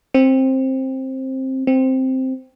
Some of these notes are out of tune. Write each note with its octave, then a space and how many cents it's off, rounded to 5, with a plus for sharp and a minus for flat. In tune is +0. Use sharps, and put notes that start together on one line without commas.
C4 +15
C4 +0